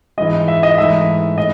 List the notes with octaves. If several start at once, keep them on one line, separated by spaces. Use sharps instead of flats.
G#2 E3 G#3 D#5
E5
D#5
G#2 E3 A3 E5
A2 D#5